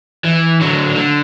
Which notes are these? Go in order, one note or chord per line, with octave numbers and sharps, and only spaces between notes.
E3
D3 F#3
D3